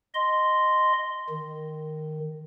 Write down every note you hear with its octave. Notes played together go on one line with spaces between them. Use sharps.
D#5 C6
D#3